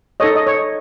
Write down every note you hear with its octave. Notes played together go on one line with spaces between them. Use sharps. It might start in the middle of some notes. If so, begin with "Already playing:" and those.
D#4 A4 C#5 D#5
D#5
C#5